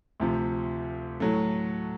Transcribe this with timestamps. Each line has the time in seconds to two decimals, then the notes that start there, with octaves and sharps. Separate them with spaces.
0.20 D2 C3 F3
1.20 A2 F#3 A3